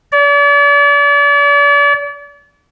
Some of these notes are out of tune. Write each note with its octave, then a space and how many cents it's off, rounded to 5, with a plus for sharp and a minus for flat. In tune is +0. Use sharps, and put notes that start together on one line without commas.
D5 -40